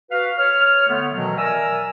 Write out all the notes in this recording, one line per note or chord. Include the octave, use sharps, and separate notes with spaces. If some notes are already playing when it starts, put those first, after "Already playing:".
F#4 B4 F5
C#5 F6
D3 A3 B3
B2 D#3 E3 F#3
A#4 D5 E5 G#5 A#5 E6